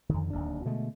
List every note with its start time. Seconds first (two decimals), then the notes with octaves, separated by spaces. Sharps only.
0.09 F2 D3 D#3
0.30 D1 D#2 D4
0.65 B2 D3 G#3 A3